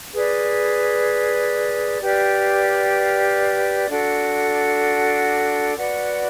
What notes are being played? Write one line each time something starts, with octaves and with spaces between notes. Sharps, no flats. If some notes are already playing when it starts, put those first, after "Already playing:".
G#4 B4 D5
G4 B4 D5 F5
D4 F#4 A4
F#4 B4 D5 F#5